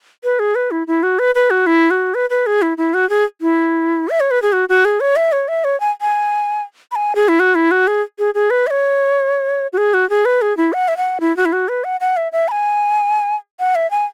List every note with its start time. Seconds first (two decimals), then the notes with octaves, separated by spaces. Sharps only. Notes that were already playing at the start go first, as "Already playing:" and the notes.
0.24 B4
0.39 G#4
0.55 B4
0.71 E4
0.87 E4
1.03 F#4
1.19 B4
1.35 B4
1.50 F#4
1.67 E4
1.91 F#4
2.14 B4
2.30 B4
2.46 G#4
2.62 E4
2.78 E4
2.94 F#4
3.10 G#4
3.41 E4
4.09 E5
4.20 C#5
4.31 B4
4.42 G#4
4.53 F#4
4.69 F#4
4.85 G#4
5.00 C#5
5.16 E5
5.32 C#5
5.48 E5
5.64 C#5
5.80 G#5
6.01 G#5
6.91 B5
6.96 G#5
7.15 G#4
7.28 E4
7.40 F#4
7.55 E4
7.71 F#4
7.87 G#4
8.19 G#4
8.35 G#4
8.50 B4
8.67 E5
8.71 C#5
9.73 F#4
9.78 G#4
9.94 F#4
10.10 G#4
10.25 B4
10.42 G#4
10.57 E4
10.73 F#5
10.88 E5
10.97 F#5
11.21 E4
11.37 F#4
11.45 E4
11.53 F#4
11.68 B4
11.84 F#5
12.01 F#5
12.17 E5
12.32 E5
12.48 B5
12.51 G#5
13.60 F#5
13.75 E5
13.91 G#5